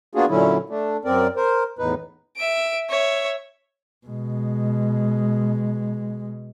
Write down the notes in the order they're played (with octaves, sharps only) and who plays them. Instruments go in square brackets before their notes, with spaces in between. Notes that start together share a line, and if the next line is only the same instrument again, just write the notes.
[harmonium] A#3 B3 D4 F4 F#4 G#4
A#2 D3 F#3 C#4 E4
A3 D4
F#2 C4 A#4 D5
A#4 C5
E2 A2 D#4 B4
[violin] E5 D7
C#5 E5
[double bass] B2 G#3